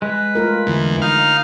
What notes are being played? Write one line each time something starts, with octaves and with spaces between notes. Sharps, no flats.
G#3 B4
A3 F4 A#4
E2 D3
D#4 F5